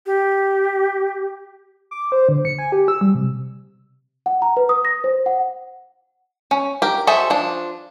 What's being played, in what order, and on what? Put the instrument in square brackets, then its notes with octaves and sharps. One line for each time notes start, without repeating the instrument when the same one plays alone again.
[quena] G4
[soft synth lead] D6
C5
D3
C#7
G#5
G4
E6
G3
C3
[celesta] F#5
A#5
B4
D#6
A#6
C5
F#5
[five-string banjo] C#4
G4 A#4
F#4 G#4 A4 C5 E5
F3 D4